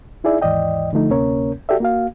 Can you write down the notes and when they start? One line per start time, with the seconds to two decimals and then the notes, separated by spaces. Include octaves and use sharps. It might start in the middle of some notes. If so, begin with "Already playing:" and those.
0.24 D#4 E4 G#4 D5 E5
0.42 D#2 G#2 E3 D5 D#5 G5
0.93 D3 F3 A3 D#4
1.10 D2 C3 A#3 C#4 A#4 C#5
1.69 F#4 G4 A4 D5 E5
1.80 A#3 F#4 F5